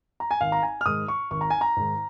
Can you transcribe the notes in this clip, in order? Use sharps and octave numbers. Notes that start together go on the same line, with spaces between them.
A#5
G#5
G#1 F5
A#5
G#5
F6
G#2 D#3 G#3 D#6
C#6
G#1 C#6
A#5
G#5
A#5
G#2 D#3 G#3